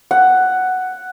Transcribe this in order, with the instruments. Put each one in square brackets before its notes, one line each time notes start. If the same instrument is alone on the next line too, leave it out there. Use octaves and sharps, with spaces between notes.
[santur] F#5